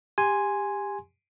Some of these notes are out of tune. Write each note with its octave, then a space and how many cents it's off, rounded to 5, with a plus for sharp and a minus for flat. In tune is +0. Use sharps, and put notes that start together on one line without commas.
G4 +20 G#5 +0 C6 +0